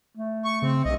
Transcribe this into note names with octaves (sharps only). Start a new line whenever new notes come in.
A3
C#6
C#3 C4
B1 G2 D#5